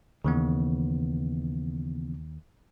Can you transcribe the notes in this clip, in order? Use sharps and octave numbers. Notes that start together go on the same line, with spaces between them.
D#2 C#3 E3 B3